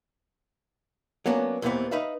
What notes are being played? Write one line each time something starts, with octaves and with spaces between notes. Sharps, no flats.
F#3 A#3 B3 C#4 D4
D#2 A#2 E3 A3 B3 C4
D#4 B4 E5 F5